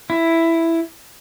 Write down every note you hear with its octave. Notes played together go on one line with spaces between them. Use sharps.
E4